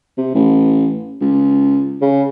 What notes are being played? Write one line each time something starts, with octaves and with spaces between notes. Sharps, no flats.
C3
A1
C#2
C#3